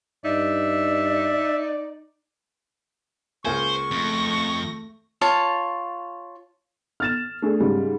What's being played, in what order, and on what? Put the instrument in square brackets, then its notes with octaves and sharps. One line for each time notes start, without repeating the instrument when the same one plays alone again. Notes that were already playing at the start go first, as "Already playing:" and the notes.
[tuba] G2 [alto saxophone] D#4 [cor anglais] D5 [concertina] E5
[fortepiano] C#2 A#3 G#5 [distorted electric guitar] C5 [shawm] C#6
[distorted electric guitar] F2 [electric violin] A3 A#6
[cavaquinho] F4 C#5 A5
[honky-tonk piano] F6 A6 E7
A3 D4 G#4
G#2 C#3 G3